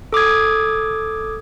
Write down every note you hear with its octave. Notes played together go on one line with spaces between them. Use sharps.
A4 D6 D#6 G#6